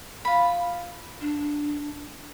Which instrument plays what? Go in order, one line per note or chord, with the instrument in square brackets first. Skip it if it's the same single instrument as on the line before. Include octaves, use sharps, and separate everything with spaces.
[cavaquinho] F4 B5
[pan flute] D4